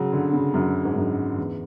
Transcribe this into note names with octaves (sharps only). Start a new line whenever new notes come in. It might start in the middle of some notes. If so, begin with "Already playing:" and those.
Already playing: C#3 F#3
D3
C#3
F#2
G#2
F#2
E2